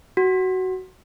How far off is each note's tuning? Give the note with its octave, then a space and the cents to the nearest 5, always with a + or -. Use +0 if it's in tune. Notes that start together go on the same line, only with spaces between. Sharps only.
F#4 +15